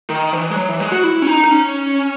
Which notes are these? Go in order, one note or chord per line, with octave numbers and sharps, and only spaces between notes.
D#3
E3
G#3
F#3
E3
G#3
F#4
E4
C#4
D#4
D#4
C#4